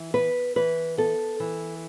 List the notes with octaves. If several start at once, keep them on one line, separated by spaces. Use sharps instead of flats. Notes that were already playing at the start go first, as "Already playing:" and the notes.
Already playing: E3
B3 B4
E3 B4
B3 A4
E3